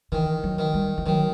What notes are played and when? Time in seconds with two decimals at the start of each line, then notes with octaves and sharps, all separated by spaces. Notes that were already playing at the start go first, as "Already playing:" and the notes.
0.12 D#3 E3
0.43 F#3
0.59 D#3
0.74 G3
0.98 E3
1.06 D#3 F#3